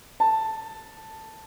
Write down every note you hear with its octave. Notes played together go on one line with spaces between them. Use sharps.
A5